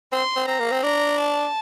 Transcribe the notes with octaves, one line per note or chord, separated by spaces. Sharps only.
C4 C6
C4
C4 A#5
A#3
C4
D4 A#5
A5